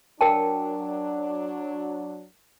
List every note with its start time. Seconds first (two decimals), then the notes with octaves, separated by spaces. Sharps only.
0.21 F#3 D4 A#4 G5 A5